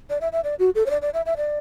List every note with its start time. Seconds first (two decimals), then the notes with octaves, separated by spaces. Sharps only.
0.10 D5
0.21 E5
0.32 E5
0.44 D5
0.59 F#4
0.75 A4
0.86 C#5
0.90 D5
1.02 D5
1.14 E5
1.26 E5
1.37 D5